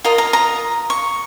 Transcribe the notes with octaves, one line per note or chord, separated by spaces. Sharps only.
F4 A#4 D#5 A#5
A#5
A#5
C#6